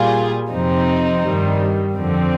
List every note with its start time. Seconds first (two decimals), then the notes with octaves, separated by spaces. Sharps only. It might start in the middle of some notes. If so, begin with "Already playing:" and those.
Already playing: A#2 G3 F4 G#4
0.50 F2 C3 F3 C4 D#4
1.22 G2 D#3 G3
1.94 F2 D3 F3 C4